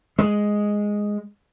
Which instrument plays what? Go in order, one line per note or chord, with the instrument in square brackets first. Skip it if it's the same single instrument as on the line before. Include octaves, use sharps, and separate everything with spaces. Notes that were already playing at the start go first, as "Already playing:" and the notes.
[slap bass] G#3